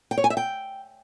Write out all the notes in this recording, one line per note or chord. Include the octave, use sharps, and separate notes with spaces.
G5
C#5
G#5
E5
G5